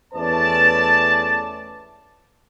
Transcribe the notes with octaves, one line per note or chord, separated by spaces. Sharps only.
E2 A3 C#4 B4 D5 A5